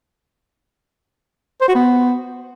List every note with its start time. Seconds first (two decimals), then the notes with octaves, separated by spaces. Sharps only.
1.61 C5
1.68 F#4
1.75 B3